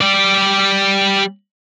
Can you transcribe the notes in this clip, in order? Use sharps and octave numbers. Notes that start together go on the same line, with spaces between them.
G3 D5